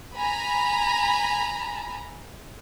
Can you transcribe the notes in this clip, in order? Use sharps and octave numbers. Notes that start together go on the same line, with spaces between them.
G#5 A#5 B5